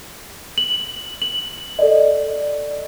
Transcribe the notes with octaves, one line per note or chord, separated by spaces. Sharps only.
F#7
F#7
A4 D5 D#5